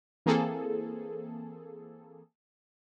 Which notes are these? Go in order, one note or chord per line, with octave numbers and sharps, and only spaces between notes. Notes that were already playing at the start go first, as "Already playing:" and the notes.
E3 A#3 C4 G#4 A4